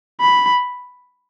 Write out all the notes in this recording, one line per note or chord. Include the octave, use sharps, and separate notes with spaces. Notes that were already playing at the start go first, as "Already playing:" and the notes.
B5